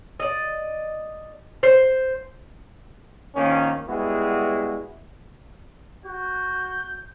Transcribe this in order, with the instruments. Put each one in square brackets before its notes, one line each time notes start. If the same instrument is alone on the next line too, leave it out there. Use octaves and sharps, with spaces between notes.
[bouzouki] D5 D#5
C5
[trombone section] A#1 D#3 A#3 C#4
G3 G#3 B3 E4 F#4 G#4
[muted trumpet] F#4 [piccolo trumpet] G6